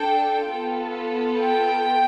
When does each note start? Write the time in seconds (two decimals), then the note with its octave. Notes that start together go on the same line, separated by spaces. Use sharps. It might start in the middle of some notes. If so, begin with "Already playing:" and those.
Already playing: D4 A4 G5
0.47 B3 F4 A4
1.39 G5